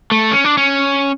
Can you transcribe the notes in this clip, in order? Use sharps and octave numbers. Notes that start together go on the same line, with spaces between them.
A3
C#4
D4
C#4